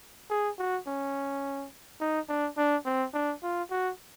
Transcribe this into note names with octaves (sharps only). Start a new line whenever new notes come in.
G#4
F#4
C#4
D#4
D4
D4
C4
D4
F4
F#4